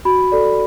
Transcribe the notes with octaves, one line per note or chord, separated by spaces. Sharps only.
F#4 B5
A4 D5